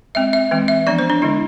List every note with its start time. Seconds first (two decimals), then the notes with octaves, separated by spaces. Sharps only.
0.15 G#3 C4 E5
0.33 E5
0.51 E3 G#3 C4
0.68 E5
0.87 F3 B3 D4 D5
0.99 C5
1.10 D4
1.22 D3 G#3 D4 E4